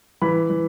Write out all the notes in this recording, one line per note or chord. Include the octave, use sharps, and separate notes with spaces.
E3 B5
E3